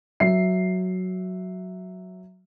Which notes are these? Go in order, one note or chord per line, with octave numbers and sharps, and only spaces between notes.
F#3 E5 C7